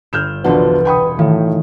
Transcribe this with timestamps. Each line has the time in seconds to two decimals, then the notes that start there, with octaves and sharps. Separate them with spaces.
0.13 G1 F6 G6 E7
0.44 E1 C2 B2 F3 D4 B4 F#5
0.85 G5 G#5 B5 C#6 D#6
1.19 A2 D#3 E3